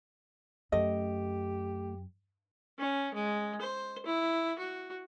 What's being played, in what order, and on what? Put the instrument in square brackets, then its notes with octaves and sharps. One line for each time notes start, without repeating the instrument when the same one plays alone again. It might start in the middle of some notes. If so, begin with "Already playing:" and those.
[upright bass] F#2 [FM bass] A3 [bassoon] G4 [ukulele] D#5
[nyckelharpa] C#4
G#3
C5
E4
F#4